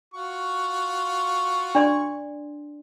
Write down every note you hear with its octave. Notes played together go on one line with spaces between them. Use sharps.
F4 F#4 C#6
D4 D5 C6